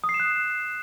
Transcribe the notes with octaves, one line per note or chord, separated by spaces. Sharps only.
D#6
C7
E7
F#6